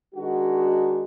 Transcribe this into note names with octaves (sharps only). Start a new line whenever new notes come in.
D#3 G#3 D4 F#4